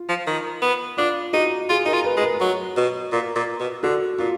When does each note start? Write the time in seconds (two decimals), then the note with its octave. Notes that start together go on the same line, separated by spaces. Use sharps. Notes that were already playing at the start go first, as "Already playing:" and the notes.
Already playing: F4
0.09 F3
0.27 D#3
0.62 B3
0.97 D4 F4
1.33 D#4 F#4
1.69 F4 G#4
1.85 D#4 A#4
1.93 F4
2.05 B4
2.17 G#3
2.23 A#4
2.41 F#3
2.77 B2
3.12 A#2
3.36 A#2
3.60 B2
3.83 D3 F#4
4.19 A#2 F4